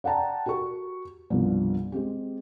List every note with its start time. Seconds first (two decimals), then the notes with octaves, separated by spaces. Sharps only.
0.04 D5 F#5 G5 A5 A#5
0.46 F#4 G4 A#4 C#6
1.30 C2 G2 B2 F3 G3 B3
1.92 G#3 C4 G4